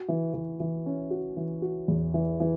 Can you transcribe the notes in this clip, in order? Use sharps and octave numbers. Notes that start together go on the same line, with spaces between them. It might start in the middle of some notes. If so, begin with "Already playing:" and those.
Already playing: F#4
E3
E3
E3
C#4
F#4
E3
F#4
E2
E3
E3